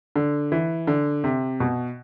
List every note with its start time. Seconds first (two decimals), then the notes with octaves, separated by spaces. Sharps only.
0.16 D3
0.52 E3
0.87 D3
1.24 C3
1.60 B2